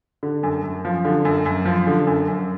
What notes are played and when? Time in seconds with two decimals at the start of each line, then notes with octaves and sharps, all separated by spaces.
0.23 D3
0.43 F#2
0.63 F#2
0.85 F3
1.05 D3
1.25 F#2
1.46 F#2
1.65 F3
1.87 D3
2.07 F#2
2.28 F#2